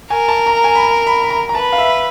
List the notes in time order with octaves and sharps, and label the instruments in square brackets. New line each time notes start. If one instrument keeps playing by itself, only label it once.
[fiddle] A#4 [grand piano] G#5
[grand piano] A5
A#5
G#5
B5
A#5
B5
B5
A#5
A#5
[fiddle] B4 [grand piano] A5
[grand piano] F5
E5